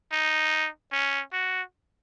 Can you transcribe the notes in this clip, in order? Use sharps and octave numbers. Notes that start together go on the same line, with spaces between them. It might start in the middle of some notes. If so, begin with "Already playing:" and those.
D#4
C#4
F#4